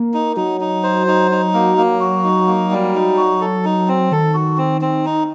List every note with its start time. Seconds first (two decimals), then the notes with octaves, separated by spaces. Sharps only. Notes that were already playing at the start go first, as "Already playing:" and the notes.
Already playing: A#3
0.14 D#4
0.37 F#3 D#4
0.61 D#4
0.83 C5
1.07 D#4
1.31 D#4
1.54 A#3
1.78 A#3
2.00 F#4
2.24 D#4
2.47 A#3
2.71 G3
2.95 D#4
3.17 F#4
3.41 A4
3.65 D#4
3.88 C4
4.12 D#3 A4
4.34 F#4
4.57 C4
4.81 C4
5.05 D#4